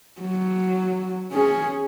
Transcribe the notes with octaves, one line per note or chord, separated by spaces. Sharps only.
F#3
C#4 G#4